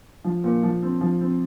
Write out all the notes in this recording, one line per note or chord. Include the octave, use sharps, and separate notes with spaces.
F3
A#2
F3
C4
F3
C4